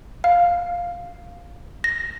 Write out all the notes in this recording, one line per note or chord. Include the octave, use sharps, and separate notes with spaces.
F5
A#6